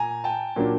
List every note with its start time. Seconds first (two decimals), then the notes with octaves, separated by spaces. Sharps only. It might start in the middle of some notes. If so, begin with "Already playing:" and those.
Already playing: A#2 G#5 A#5
0.24 G5 A5
0.56 A#2 F#3 A#3 D4